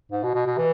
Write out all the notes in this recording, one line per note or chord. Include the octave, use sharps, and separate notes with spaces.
G#2
B2
B2
B2
E3